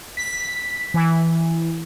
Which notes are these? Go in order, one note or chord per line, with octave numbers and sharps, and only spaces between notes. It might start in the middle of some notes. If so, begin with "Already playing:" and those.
B6
E3